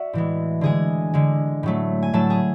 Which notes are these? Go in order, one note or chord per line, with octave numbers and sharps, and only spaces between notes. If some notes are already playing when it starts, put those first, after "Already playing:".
Already playing: F#4 D5 E5 F#5
A2 E3 G#3
D3 G#3 G#4 G#5
D3 G#3
A2 F#3 A3
G#5
A2 F#3 A3 A4 A5
G#4 G#5